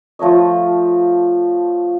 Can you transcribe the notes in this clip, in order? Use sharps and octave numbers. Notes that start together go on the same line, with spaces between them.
F3 A3 C#5 D#5